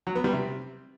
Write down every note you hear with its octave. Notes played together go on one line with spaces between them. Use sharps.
F#3
B3
G3
C3